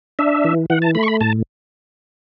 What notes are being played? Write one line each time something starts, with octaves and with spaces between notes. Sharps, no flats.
D4 E5
E3
E3 F#5
A5
A3 B5
C#6
B5
A2 A5